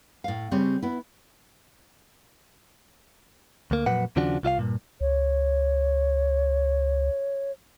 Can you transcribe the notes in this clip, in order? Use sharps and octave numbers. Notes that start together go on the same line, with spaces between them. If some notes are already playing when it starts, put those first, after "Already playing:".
A2 F5
C#3 G3 C4 C#5
B3 E4
D2 A#3
F2 A#2 F#3 B4 F#5
D#2 C#3 F3 D4 F#4
C2 F4 E5 F5
G2 A#2
C#2 C#5